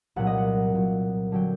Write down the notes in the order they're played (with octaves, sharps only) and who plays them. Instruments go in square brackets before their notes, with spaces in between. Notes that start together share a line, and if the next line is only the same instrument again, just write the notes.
[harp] C2 A#2 F#3 F#5
D#5
F#5
C2 A#2 F#3
D3 F#3 G5